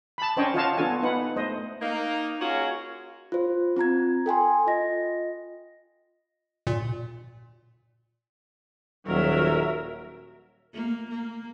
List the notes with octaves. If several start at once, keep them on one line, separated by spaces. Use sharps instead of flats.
A5 B5
C#4 D4 C5 C#5 D#5 G5
F4 F#4 C#5 D#5 F5 A5
B3 D4 F4 F#4 A4 G#5
B3 D#4 B4 F#5
A3 C5 D#5
A#3 D#4
C#4 F4 F#4 G#4 A#4 C#5
F4 C5
C4 F4 A#5 G#6
A4 G5 G#5 C6
F4 D#5 A#6
A#2
D#1 F#3 A#4 E5
A#3
A#3